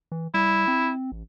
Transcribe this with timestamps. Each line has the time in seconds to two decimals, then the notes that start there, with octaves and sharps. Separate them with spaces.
0.12 E3
0.34 G3 E4
0.68 C4
1.12 A1